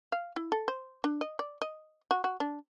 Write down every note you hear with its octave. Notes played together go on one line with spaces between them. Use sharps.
F5
E4
A4
C5
D4
D#5
D5
D#5
F#4
F#4
D4